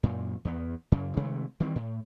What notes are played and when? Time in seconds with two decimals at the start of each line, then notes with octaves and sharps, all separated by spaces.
0.03 F#2 A#2
0.45 E2 B3
0.92 F#2 C#3
1.17 C3 D#3 G#3 A3
1.60 D#3 E3 G3 C4
1.76 A2